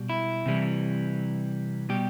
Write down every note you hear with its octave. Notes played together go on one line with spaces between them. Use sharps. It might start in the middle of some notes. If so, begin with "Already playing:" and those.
Already playing: B2 G3
E4
C3 E3 G3
B2 G3 G4